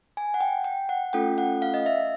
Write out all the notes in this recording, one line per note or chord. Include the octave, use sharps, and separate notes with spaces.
G#5
F#5
G5
G5
F#5
A3 C#4 F4 A4 G5
F#5
F5
D#5
E5